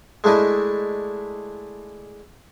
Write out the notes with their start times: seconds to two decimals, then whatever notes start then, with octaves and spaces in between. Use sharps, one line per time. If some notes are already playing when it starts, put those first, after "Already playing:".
0.24 G#3 A3 D4 E4 D#5